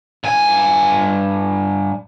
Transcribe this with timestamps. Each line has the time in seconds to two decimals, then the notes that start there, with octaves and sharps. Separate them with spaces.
0.24 G2 G#5